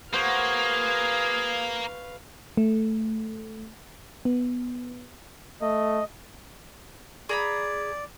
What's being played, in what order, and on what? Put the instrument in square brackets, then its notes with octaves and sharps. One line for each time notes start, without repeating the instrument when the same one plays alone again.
[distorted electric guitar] A#3 [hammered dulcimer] F#4 C5 [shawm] G#4 [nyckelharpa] B4 F5
[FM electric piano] A3
B3
[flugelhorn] A3 [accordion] D#5
[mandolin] G#4 A#5 B5 [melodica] D5